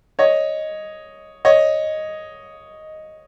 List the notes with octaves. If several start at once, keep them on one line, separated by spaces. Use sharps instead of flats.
C#5 D#5
C#5 D#5